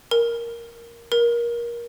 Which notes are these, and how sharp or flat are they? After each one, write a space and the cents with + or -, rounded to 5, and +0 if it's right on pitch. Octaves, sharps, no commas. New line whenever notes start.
A#4 +0
A#4 +20